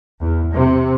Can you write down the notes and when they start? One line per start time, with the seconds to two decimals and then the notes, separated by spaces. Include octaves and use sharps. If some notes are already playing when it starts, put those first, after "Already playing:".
0.21 E2
0.52 C3